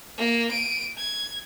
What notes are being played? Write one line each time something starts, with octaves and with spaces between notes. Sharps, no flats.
A#3
D7 D#7
G#6